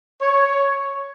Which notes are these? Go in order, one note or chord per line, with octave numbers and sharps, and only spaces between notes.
C#5